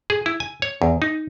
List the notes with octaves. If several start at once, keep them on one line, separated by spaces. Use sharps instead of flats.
G#4
E4
G#5
C#5
E2
D#4